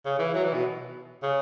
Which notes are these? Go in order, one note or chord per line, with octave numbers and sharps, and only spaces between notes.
C#3
E3
F#3
E3
B2
C#3